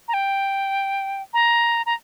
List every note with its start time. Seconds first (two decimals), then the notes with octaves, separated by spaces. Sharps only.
0.08 A#5
0.14 G5
1.34 A#5
1.86 A#5